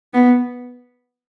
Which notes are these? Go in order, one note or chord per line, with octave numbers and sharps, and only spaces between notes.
B3